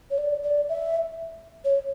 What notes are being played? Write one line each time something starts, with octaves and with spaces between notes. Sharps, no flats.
C#5
D5
D5
E5
C#5